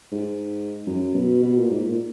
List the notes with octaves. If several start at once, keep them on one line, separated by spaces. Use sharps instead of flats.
G#2
F#2
B2
B2
A#2
G#2
A#2